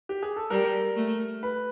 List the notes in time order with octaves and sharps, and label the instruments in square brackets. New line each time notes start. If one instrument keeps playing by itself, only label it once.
[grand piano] G4
G#4
A4
[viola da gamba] G3 [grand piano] A#4
[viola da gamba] A3
[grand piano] B4